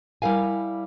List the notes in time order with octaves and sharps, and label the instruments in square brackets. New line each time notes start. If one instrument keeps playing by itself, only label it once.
[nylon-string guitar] G3 E4 A#4 F5 G#5